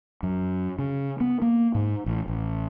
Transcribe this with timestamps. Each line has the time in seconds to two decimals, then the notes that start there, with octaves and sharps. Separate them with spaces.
0.23 F#2
0.79 C#3
1.20 B3
1.42 A#3
1.75 G#2
2.06 A1
2.28 A1